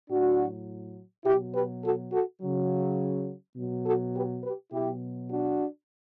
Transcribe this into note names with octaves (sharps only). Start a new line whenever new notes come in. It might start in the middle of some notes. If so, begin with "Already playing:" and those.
A2 F#3 D4 F#4
B2 F#3 E4 G4
G4 B4
F#4 A4
F#4 A4
C#3 F#3
B2 F#3
F#4 A4
G4 B4
G4 B4
B2 F#3 E4 G4
D4 F#4